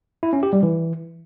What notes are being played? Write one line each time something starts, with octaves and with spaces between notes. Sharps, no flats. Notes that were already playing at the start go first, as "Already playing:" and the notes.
E4
C#4
G4
G3
E3